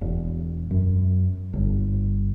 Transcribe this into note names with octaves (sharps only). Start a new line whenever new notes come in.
E1
F#2
G1